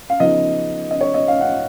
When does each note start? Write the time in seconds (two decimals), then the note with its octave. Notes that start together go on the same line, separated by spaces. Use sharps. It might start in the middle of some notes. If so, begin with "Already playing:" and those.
0.10 F5
0.20 C#3 F3 B3 D#4 D#5
0.91 D#5
1.01 C#5
1.14 D#5
1.28 F5
1.41 F#5